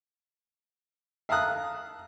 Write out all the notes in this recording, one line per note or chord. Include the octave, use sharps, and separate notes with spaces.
E5 F5 A5 A#5 D#6 F#6